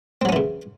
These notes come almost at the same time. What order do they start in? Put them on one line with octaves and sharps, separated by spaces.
C4 F#3 C#4 E3 C#3